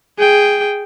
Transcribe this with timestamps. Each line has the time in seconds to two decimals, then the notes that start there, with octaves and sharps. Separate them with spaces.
0.18 G#4 G5